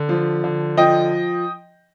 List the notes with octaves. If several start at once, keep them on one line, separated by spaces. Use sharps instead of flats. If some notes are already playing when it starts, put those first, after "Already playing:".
Already playing: D3
F3
D3
F3 D#5 G5